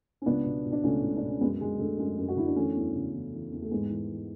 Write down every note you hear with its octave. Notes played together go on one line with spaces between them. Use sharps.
C#4
C#2 B3 D4
B2
B2
D4
C#2 A3 C#4
C#2
D4
B2
C#4
F#2 G#3 B3
D3 G#3
D3 A3
F#2 G#3
F#2
F#4
D3 E4
D4
E3 A3 C#4
E2
C#3
E2
E3
E2
A3
G#2 G#3 B3
E3
E3